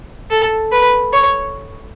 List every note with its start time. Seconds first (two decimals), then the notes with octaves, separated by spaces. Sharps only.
0.30 A4
0.72 B4
1.13 C#5